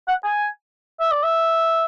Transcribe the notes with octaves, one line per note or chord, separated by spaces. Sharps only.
F#5
G#5
E5
D5
E5